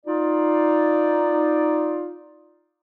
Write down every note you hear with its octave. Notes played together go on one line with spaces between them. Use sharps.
D#4 F4 D5